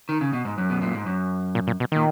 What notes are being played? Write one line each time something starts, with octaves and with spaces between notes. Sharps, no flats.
D#3
C#3
B2
G#2
F#2
B2
A#2
G#2
F#2
A#2
A#2
B2
A#2 D#3